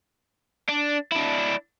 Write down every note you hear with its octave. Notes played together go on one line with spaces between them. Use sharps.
D4
D4 E4